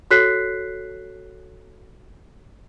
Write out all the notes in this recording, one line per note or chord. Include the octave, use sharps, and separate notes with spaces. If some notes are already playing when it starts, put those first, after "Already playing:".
F#4 A4 C#5 F#6 B6 C7